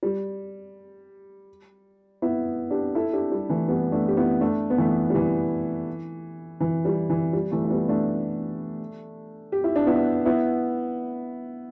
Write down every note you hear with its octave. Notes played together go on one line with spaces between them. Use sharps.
G3
B3 E4
D4 G4
E4 A4
D4 G4
G3
E3 A3
G3 B3
A3 D4
G4
B3 E4
A3 D4
B3
E3 A3
G3
E3
E3
G3
E3
G3
E3 A3
A3
G3 B3
A3 D4
G4
E4
D4
B3 E4
B3 E4